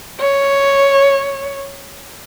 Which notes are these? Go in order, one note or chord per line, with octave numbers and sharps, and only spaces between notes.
C#5